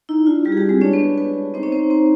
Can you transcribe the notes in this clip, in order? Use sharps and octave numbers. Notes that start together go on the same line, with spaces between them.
D#4 E4
D4 F4
G3 D#4 G4
G#4
G3 D4 G4
G#3 C4 G#4
C#4 D4 C#5
B3 B4
B3 B4
C4 D#4 C5
C#4 C#5
C4 C5
C4 C5